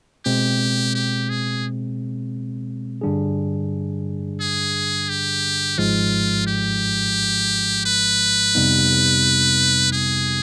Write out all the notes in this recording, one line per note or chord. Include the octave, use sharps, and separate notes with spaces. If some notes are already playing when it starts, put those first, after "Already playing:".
B2 G#3 C4 G4
G4
G#4
G2 D3 G3 D4 G#4
G#4
G4
G#1 G#2 F3 G#3 F4
G4
B4
F2 C3 G3 B3 D#4
G#4